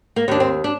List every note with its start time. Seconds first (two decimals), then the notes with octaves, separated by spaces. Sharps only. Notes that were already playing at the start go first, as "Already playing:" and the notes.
0.16 A#3
0.28 D#2 D4
0.40 C4
0.64 D4